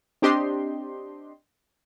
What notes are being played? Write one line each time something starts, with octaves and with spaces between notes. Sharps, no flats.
C4 D4 G4 D#5 C6